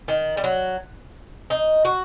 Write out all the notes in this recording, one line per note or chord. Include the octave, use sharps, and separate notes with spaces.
D#3
G3
F#3
D#4
F#4